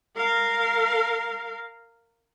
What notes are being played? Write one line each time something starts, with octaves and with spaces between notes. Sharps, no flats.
A#4 F5